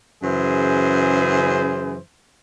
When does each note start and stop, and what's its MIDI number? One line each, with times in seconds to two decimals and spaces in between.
0.23 1.98 42
0.23 1.98 49
0.23 1.98 52
0.23 1.98 68
0.23 1.98 72